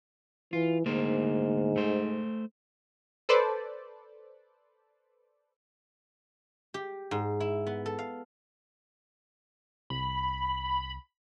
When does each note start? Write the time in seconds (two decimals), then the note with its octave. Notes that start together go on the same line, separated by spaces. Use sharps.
0.53 E3 F4
0.86 D2 G#2 A#3 C5
1.76 A3 C5
3.29 A4 B4 C5 D5
6.74 G4
7.11 G#2
7.40 E4
7.67 B3
7.86 A4
7.99 F5
9.90 C2 B5